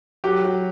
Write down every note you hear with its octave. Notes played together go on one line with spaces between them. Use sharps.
F#3 G4
F#3